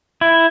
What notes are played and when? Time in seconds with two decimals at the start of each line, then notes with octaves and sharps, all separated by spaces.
0.21 E4